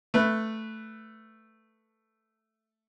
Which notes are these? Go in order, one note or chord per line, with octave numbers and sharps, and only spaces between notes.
A3 B4